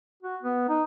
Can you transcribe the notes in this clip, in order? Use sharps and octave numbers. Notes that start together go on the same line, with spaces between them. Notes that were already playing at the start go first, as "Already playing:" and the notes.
F#4
B3
D#4